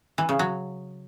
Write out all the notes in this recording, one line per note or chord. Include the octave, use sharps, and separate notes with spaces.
E3
C#3
F#3